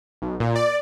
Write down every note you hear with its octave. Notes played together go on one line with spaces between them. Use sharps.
B1
A#2
D5